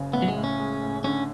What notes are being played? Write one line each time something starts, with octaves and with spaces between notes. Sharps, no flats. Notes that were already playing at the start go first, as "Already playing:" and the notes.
Already playing: F#1 C#3
A2 B3
F#3
G#3
A2
C#4
G#3
A2
D3 C#4